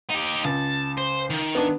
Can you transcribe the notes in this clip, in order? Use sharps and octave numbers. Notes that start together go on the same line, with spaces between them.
D#4 G4
C#2 A5
C5
D#3
B3 D4